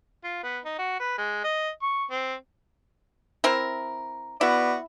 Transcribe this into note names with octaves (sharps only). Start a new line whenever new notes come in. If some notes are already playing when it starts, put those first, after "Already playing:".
F4
B3
D#4
F#4
B4
G#3
D#5
C#6
C4
C4 E4 A#4
B3 E4 F#4 D5